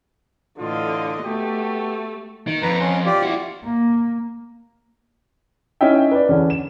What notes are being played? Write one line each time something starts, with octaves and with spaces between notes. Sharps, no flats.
A2 D3 E3 F4 D#5
A3 B3 F#4 G4
D#3
F2 B4 A#5
C#4 C6
F4 G4 D5
E4 F#4
A#3
C#4 D#4 E4 D#5 E5 G5
B4 D5
E2 D3 C#4 D4
E7